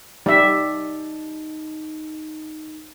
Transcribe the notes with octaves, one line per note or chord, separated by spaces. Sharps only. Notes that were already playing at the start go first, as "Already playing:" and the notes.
G3 D#4 E5